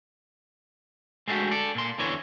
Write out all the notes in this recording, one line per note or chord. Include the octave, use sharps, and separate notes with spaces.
G#3 A3 D4 D#4 F#4 G4
A4 D5
A#2 C6
E2 D3 E3 C#5